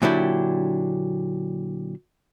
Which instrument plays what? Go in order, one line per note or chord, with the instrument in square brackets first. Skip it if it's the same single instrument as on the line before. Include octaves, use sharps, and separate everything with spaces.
[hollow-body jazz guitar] A#2 D3 F#3 D4 E4 G4